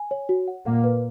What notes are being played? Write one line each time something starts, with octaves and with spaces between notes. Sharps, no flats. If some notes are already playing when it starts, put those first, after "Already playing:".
Already playing: G#5
C#5
F#4
F#5
A#2 A#3 F#5
B4